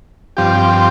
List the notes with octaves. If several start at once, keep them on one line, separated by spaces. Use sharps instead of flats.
G2 F3 C4 G4